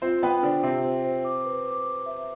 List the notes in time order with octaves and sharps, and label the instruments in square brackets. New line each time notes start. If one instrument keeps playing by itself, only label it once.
[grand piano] C4 C5 [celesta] F4
[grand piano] B3 B4 [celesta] G5
[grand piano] D3 D4 [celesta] C5
[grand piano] C3 C4 [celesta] E5
[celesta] C5
C5
D6
B4
D6
D6
E5